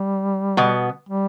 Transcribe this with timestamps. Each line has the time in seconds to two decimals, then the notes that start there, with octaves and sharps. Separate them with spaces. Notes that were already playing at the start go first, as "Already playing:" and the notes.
Already playing: G3
0.57 B2 B3
1.09 G3